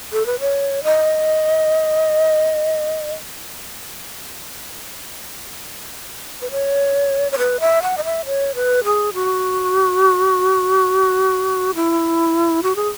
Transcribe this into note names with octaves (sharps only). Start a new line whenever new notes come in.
A4
B4
C#5
D#5
B4
C#5
C#5
B4
E5
F#5
D#5
E5
C#5
B4
G#4
F#4
E4
F#4
G#4